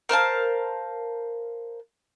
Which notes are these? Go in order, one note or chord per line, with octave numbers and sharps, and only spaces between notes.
A#4 C5 F5 A5